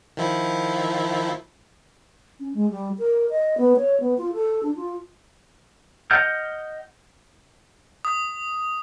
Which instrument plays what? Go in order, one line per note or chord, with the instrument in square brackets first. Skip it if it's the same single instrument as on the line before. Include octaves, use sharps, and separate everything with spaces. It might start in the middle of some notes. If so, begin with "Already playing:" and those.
[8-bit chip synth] D#3 F3 E4
[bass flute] C#4
G#3
G3
A#4
D#5
B3
C#5
B3
F4
A4
D4
F4
[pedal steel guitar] D#5 F#5 F6 G6
[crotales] D#6